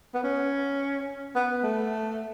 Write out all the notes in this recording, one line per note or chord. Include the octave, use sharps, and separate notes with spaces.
B3
C#4
B3
A3